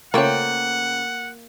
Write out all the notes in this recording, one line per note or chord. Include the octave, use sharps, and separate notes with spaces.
C#3 A3 A#3 F4 C5 C#5 F#5 G5